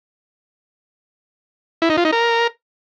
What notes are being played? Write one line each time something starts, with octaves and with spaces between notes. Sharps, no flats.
E4
D#4
F4
D#4
A#4